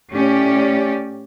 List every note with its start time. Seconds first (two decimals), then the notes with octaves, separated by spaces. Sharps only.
0.13 A2 C#4 G4 D5